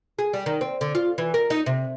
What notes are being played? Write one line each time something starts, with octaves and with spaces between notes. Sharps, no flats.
G#4
G3
D#3
C4
D3
F4
E3
A#4
D#4
C3